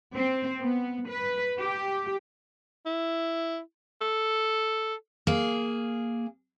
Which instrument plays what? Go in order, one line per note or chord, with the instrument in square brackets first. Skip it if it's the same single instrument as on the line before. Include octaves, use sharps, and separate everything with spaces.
[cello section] C4
B3
B4
G4
[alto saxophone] E4
A4
[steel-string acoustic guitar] A#3 G#4